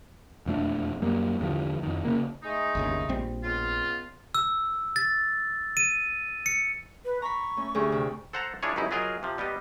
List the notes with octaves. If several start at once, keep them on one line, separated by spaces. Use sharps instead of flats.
E1 F2 A3 D4
F#2 G3 A#3
E2 G2 D3 F3
F2 D#3
C#3 A#3
G#3 A3 D#4
G1 D#2 C#3
A#1 G3 C4
C#2 B3 F4
E6
A6
D#7
C#7
B4
A#5 B5 C#6
A3 C#4
D2 G4 G#4
C3
A4 C5 F#5 A5 A#5
D4 E4 F4 G#4 C#5
G1 F#2 D#4 E4
F#3 F4 G#4 A#4 D#5
C3 F3
G3 B3 G4 D#5